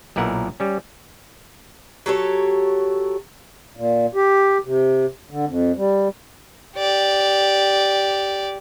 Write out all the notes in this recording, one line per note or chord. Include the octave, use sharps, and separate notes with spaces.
B1 A#2 E4 A#4 F#5
G3 C#4
F#3 G4 A4 C#5
A#2
G4
C3
D3
F2
G3
G4 D5